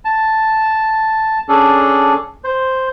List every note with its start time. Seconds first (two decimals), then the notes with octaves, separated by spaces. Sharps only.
0.05 A5
1.49 C#4 D4 G#4 A4
2.44 C5